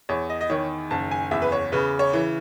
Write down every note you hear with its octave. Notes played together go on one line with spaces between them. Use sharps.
E2 C#5
D#5
D#5
D#3 C#5
F#1 A5
G#5
E2 E5
B4
C#5
C#3 B4
C#5
E3